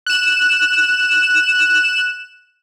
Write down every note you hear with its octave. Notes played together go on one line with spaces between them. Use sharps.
F#6 E7